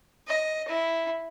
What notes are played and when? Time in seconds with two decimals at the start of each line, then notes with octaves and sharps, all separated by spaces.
0.28 D#5
0.68 E4